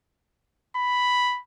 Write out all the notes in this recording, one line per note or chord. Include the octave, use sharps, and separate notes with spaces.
B5